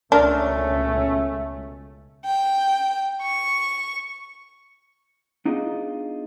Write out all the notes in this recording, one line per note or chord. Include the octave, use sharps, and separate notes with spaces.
C#2 B2 A3 C#4 D4 A#4
G5
C#6
B3 D4 D#4 F4 G#4 D#5